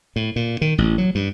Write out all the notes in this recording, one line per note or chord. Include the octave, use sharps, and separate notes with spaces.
A2
A#2
D#3
A1
F#3
G2